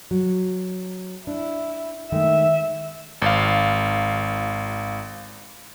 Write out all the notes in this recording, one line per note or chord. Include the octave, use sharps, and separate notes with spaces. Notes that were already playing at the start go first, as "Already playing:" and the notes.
F#3
D4 E4
D#3 G#3 A3 E5
G#1 F5